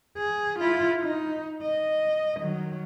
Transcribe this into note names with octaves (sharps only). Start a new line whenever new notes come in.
G#4
E4 F4
D#4
D#5
D#3 F#3